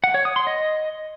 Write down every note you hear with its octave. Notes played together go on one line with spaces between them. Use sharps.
F#5
C#5
D#6
C6
D#5